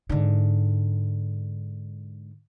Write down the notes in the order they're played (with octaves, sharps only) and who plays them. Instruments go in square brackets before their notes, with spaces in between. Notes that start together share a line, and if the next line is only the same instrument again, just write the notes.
[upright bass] G#2 D3